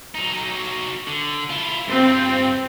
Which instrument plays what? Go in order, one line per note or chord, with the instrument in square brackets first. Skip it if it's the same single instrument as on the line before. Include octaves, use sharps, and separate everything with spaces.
[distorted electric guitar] F#3 D#4
D3
E4 F4
[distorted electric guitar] G2 F4 [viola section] C4